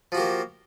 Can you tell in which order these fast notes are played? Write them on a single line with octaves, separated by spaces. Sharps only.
F3 F#4 G4 A#3